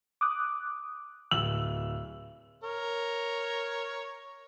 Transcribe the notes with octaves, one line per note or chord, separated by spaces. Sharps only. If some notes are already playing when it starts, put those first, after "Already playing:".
D6 D#6 F#6
D1 E6 F#7
A#4 C#5